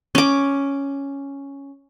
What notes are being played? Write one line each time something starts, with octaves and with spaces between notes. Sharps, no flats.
C#4 D6